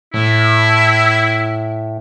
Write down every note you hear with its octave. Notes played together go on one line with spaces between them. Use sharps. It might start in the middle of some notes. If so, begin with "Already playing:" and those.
A2 E4